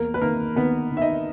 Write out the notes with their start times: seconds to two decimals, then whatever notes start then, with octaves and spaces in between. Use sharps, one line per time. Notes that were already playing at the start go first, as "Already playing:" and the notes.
Already playing: E2 A#3 A#4
0.14 B4
0.21 D#3 A#3 A#4
0.56 D#3 B3 B4
0.91 D#3
0.97 E5
1.02 D#4 D#5